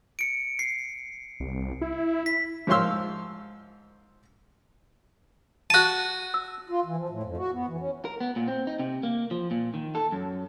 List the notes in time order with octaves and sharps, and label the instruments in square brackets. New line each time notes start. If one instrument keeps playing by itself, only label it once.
[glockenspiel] C#7 D7
C7
[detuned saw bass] C2
E4
[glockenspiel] B6
[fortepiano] G#2 F3 C#5 F5 C6 E6
[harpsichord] F#4 A5 [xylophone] F#6 D#7
[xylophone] E6
[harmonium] F4
E3
F3
A2
F2
F#4
B3
E3
C#4
[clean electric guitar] A#4
B3
A#2
C4
D#4
C3
A#3
F3
A#2
D#3
A4
F#2